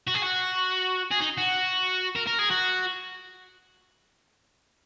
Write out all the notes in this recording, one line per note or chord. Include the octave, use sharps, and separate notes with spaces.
F#4
G#4
F#4
G#4
D#4
F#4
A#4
A#4
G#4
F#4